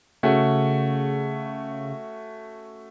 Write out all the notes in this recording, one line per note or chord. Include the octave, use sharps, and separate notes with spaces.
C#3 A3 C#4 F#4